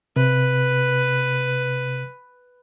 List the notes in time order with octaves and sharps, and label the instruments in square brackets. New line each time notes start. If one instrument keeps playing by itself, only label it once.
[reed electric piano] C3 [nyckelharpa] B4